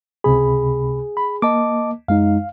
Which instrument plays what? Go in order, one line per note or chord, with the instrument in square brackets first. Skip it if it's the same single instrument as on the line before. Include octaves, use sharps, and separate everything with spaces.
[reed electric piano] C#2 C3 B5 [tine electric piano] G#4
[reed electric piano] B5
[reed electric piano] A#3 [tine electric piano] D#5 A5 D6
[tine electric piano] F#2 G#3 D#4 [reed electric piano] F5